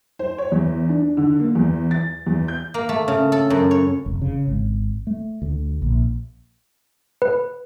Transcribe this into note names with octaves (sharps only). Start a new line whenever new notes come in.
C5
C#5
E2
D4
D3
A#3
E2
A6
E2
G6
A#3
A3
C#3
A4
F#2
C#5
F1
C#3
G#1
A3
D2
A#1
B4